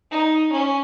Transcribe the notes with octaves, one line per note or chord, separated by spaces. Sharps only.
D#4
C#4